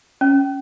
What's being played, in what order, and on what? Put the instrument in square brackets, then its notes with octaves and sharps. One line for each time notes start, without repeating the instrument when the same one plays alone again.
[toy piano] C#4